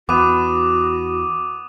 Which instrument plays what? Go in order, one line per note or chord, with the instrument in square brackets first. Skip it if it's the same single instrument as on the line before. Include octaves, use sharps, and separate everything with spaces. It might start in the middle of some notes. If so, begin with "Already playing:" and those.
[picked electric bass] E2 [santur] B3 [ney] F#4 [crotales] D6 D#6 D#7